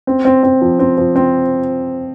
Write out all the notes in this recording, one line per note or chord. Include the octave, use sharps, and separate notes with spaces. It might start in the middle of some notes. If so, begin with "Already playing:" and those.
C4
C4
C4
F3
C4
F3
C4